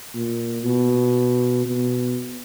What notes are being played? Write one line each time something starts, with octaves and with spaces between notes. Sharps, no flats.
A#2
B2
B2